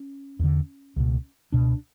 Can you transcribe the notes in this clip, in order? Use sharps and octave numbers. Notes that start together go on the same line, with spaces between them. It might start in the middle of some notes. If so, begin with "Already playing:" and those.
Already playing: C#4
E2 D3
C#2 B2
C#2 B2 D4